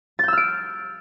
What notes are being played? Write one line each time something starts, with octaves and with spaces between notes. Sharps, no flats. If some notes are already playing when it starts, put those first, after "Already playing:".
E6 F6 G6 A6 D7